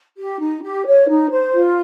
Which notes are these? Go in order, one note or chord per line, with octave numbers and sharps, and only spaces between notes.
G4
D#4
G4
C#5
D#4
C5
F4